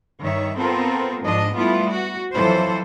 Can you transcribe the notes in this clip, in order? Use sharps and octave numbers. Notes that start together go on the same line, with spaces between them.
G2 D#3 C#5 E5
B3 C4 F4 A4 A#4
G#2 F3 D4 D#5
G3 A3 B3 E4 F4
F#4
F2 E3 F#3 F4 A4 C5